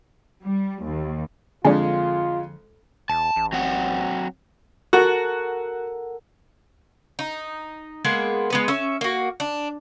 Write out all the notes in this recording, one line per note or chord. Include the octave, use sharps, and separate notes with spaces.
G3
D#2
F2 D3 F3 G#3 D4 F4 G#4
E1 A5
A1
F#3 C4 F#5
F#4 A4 A#4 F#5
D#4
G#3 A#3 B3 G#4
G#3 B3 B4
C#4 E5
A#3 F#4
D4